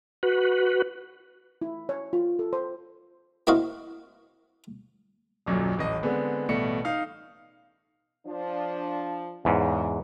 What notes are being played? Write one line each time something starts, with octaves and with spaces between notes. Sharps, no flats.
F#4 B4
E4
C#5
F4
A4
C5
A#3 C4 E4 F#4 D#5 F5
D#1 B1 F#2 A#2
D#1 A1 D#5
D3 G#3 B3 C4
A1 B2 G3 A3 C#7
D#4 F5 F6
F3 D4
E2 G#2 C#3